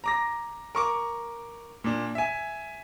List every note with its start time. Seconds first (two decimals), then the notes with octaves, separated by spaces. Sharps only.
0.04 A#5 D6 A#6
0.75 A#4 C#6 D6
1.84 A#2 D4
2.15 E5 G#5